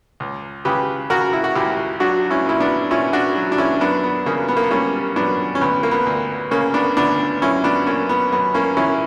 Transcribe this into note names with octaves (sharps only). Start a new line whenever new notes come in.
C#2
C#3 G4 B4
C#3 F#4 A#4
E4
F#4
C#2 E4 G4
F#3 D4 F#4
C#4 E4
A#2 E4
B3 D4
A#2 C#4 E4
D4 F#4
F#3
D4
C#4 E4
F#2 B3 D4
B3
C#3 A#3
B3
A#3
B3
G3 A#3 C#4
F#2 B3 D4
C#4
D2 B3
A#3
B3
D2
C#3 A#3 C#4
B3 D4
D2 B3 D4
F#2 C#4 E4
B3 D4
F#2 A#3 C#4
B3
F#2 B3
A#3 C#4
E3 C#4 E4